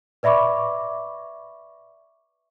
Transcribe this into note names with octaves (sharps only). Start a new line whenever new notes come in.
B4 D5 E5 B5 C#6 D6